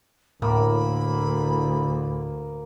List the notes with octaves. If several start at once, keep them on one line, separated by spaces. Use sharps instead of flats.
D2 A2 A#3 B5